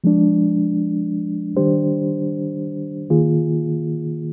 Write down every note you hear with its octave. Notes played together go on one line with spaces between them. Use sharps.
F3 G#3 D4
D#3 G3 D4 G4 C5
D#3 A#3 F4 G#4